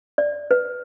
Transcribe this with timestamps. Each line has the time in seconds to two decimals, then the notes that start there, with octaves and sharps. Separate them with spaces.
0.18 D5
0.51 B4